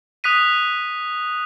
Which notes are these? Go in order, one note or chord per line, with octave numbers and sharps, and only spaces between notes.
D#6 F#6 B6 D#7